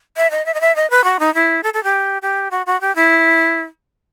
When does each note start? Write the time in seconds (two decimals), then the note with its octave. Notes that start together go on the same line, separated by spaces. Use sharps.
0.17 E5
0.31 D#5
0.46 E5
0.54 D#5
0.61 E5
0.76 D#5
0.90 B4
1.04 F#4
1.20 D#4
1.35 E4
1.63 A4
1.74 A4
1.84 G4
2.22 G4
2.51 F#4
2.66 F#4
2.81 G4
2.95 E4